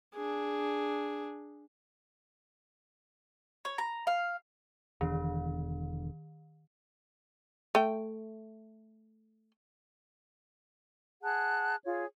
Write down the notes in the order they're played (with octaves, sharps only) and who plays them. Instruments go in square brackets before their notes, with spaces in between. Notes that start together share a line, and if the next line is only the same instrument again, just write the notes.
[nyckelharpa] D4 G#4
[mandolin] C#5
A#5
F5
[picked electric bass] E1 E2 D3 [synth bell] D#3
[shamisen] A3 G5
[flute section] G#4 F#5 A5 F#6
F4 G#4 C#5